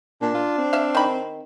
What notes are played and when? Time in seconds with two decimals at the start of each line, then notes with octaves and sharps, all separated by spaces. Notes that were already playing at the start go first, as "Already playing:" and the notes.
0.21 A#2 D4
0.34 F4
0.58 C4
0.73 E5 F5
0.95 D#3 B5